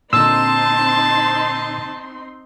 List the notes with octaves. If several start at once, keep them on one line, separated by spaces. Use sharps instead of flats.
A#2 D3 C4 D#4 A5 C6 E6